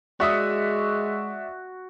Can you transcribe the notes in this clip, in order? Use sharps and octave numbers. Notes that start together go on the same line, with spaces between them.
G#3 F#4 D5 E5 D#6